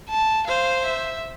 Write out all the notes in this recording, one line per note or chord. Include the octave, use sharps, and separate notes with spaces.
A5
C5 F5
E5